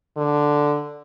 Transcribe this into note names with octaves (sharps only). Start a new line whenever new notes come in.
D3